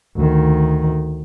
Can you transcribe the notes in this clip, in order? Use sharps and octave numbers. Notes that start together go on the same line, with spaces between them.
D2 D#3